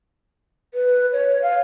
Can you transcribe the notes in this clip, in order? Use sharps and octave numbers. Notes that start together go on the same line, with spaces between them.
B4
C#5
F5